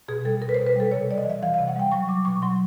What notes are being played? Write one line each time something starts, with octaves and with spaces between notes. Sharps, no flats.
B2 G#4
G3 A4
B2 A#4
B4
C5
B2
B4
G3 A4
C3 C#5
G3 D5
D#5
E3 E5
E3 F5
F5
C3
F#5
G3 G5
F#3 C#6
F#3 D6
B2 C#6
F#3 C6